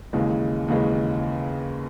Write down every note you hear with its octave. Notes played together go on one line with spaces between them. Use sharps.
D#2 C#3 E3 G#3
D#2 C#3 E3 G#3